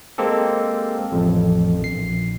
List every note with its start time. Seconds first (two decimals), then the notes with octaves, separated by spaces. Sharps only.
0.18 G#3 A#3 C4 G4 A4
1.12 A1 F2
1.80 A#1 C7